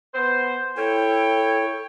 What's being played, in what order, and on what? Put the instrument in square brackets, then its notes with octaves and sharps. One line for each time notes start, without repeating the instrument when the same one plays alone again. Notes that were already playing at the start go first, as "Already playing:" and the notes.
[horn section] B3 C5
[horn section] E4 C#5 G5 [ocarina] A4